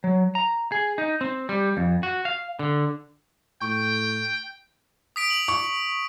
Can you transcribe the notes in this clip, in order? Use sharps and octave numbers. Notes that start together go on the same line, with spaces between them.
F#3
A#5
G#4
D#4
C4
G3
F2
F#4
F5
D3
A2 G5 C#6
D#6 B6 D7
F#7
C#6